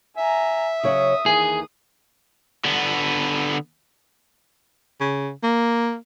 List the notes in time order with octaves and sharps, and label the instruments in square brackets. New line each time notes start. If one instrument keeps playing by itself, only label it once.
[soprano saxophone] E5 [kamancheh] G#5 A#5
[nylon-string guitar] C#3 F#3 C#5 [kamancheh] D#6
[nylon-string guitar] D#2 E3 [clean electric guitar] G#4
[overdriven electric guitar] D3 B3
[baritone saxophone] C#3
A#3